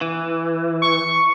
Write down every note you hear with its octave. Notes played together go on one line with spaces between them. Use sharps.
E3
C#6